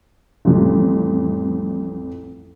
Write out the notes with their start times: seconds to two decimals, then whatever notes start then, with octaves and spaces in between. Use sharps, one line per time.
0.45 A1 F2 F3 G3 A3